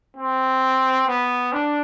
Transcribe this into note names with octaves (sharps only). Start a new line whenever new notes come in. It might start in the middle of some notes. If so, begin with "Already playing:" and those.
C4
B3
D4